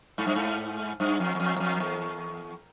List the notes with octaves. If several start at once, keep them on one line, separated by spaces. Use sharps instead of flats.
G#2
G2
G#2
G2
F2
E2
F2
E2
F2
E2